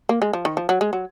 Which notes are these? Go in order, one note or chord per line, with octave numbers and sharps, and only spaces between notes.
A#3
G#3
F3
D#3
F3
F#3
G#3
F#3